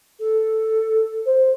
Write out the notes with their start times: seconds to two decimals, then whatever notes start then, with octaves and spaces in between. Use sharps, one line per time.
0.20 A4
1.26 C5